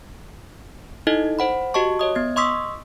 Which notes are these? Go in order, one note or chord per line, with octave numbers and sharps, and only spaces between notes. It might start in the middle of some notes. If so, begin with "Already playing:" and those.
D#4 E4 A4 D#5
C5 F#5 B5
F#4 G4 D#5 A5 C#6
C#5 D#5 D#6
B3 G#6
D#5 C6 C#6 D#6 E6 B6